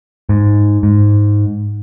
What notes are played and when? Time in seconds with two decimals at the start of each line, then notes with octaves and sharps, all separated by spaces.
0.29 G#2
0.83 G#2